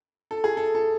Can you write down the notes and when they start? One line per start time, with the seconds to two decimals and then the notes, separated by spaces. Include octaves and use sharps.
0.31 A4
0.44 G#4
0.57 A4
0.75 A4